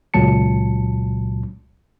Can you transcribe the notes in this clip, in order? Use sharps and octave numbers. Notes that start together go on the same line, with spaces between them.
C#2 A#2 F#3 A5 C#7